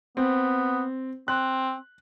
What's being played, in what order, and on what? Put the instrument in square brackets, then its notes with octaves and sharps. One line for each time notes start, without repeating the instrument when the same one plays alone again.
[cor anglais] B3 [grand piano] C4
[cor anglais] C4 [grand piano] F#6